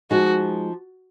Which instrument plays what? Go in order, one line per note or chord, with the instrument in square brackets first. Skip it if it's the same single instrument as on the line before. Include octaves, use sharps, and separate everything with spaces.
[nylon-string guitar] F3 G#3 D#4 [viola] F#4